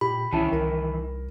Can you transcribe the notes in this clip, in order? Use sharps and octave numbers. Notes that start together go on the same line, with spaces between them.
A#2 G4 B5
C2 D#3 E3 C#4 E4 A5
C2 A#4